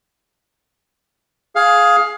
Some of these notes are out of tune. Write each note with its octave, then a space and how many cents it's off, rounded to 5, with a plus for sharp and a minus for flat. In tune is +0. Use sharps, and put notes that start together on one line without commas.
G#4 +10 F5 +10